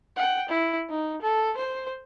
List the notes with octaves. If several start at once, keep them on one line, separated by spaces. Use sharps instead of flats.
F#5 G5
E4
D#4
A4
C5